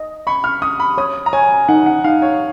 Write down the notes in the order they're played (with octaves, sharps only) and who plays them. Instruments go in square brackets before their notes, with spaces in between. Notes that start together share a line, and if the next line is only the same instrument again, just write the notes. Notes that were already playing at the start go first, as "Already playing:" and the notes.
Already playing: [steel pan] D#5
[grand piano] B5 [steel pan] C#6
[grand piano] F6
[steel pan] C#6 [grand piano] D#6
[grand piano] B5
[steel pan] C#5 [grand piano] D#6
[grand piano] A#5
[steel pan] C#5 [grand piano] G#5
[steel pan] D#4 [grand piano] F#5
[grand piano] F#5
[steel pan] D#4 [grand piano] F5
[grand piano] C#5